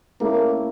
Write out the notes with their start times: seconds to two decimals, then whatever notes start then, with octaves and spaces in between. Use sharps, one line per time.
0.21 A3 A#3 C#4 E4